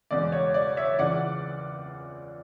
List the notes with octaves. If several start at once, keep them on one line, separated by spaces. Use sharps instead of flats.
E1 E2 C#3 G#3 D5
C#5
D5
C#5 E5
C#2 C#3 E3 D5 F#5